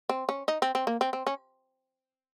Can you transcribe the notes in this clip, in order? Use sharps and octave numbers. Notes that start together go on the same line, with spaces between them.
C4
C#4
D#4
C4
C4
A#3
C4
C4
C#4